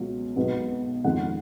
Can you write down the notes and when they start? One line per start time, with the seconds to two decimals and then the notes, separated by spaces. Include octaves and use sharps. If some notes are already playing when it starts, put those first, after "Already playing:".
Already playing: C#2 B2 F#3 F4
0.36 B1 B2 G#3 B3
1.04 F2 D#3 G#3 C#4 F4 F#5